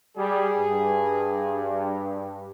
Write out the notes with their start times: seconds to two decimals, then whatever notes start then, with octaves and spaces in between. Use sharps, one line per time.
0.17 G3 G#4
0.57 G2